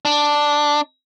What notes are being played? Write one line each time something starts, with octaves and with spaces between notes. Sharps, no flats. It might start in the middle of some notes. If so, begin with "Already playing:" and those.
D4